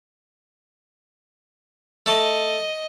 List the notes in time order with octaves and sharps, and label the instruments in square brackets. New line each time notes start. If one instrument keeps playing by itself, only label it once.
[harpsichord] A3 A5 [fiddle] D#5